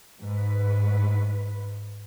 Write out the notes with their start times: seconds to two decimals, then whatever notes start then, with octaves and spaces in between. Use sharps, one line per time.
0.20 G#2 B4